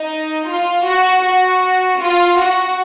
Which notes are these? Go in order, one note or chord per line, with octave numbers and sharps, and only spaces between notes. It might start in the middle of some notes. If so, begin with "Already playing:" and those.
Already playing: D#4
F4
F#4
F#4
F4
F#4